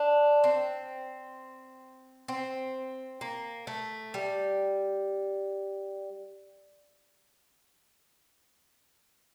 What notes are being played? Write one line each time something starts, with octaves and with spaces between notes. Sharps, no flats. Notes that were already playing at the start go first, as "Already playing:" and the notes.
Already playing: D4
C4
C4
A#3
A3
G3